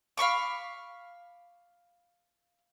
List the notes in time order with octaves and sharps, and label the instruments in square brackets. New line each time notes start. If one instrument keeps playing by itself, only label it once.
[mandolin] F5 B5 C#6 D6